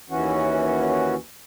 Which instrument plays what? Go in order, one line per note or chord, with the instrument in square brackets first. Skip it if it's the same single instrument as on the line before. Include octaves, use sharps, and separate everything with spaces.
[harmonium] D#2 E3 C#4 F#4